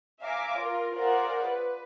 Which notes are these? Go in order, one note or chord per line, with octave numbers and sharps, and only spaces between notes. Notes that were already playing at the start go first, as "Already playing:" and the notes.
E5 F5 G#5 A#5 D6
F4 A#4
F4 G#4 A#4 C5 D5 F#5
B4